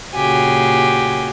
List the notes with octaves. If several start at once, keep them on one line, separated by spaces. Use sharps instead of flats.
A#2 C#3 F#4 G4 G#5